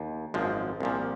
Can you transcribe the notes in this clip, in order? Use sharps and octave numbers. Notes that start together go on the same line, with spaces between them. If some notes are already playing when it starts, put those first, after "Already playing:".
Already playing: D#2
G#1 F#2 F3 G#3
C2 A#2 F3